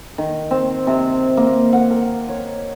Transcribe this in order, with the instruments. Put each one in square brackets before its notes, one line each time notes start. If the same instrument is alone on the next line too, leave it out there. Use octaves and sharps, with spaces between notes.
[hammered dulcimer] D#3
C4
C3
A#3
F#5
A#4
C#5